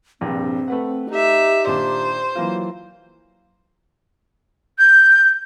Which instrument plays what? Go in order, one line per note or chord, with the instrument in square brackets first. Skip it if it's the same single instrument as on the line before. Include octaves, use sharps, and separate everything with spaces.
[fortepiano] A#1 G2 C3 [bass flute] C4
[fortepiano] A3 B4 F#5
[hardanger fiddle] D#4 E5 [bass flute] G4
[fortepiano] A#2 D#3 D4 [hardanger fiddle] C5
[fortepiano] E3 A#3 F4 [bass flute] F#3
[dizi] G6